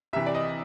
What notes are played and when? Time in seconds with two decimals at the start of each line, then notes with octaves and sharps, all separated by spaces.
0.13 C2 C3 E3 E5
0.26 D5
0.35 D#5